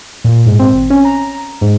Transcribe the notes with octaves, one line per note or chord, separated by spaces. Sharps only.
A#2
G#2
C4
G#1
C#4
A#5
G#2